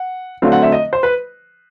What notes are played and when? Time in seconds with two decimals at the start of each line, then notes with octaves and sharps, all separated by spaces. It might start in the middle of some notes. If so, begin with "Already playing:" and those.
Already playing: F#5
0.42 D3 F#3 A3 C4 F5
0.52 F#5
0.62 E5
0.72 D#5
0.93 C5
1.03 B4